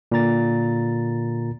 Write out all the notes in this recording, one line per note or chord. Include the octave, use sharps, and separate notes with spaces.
A#2 D3 A#5 A6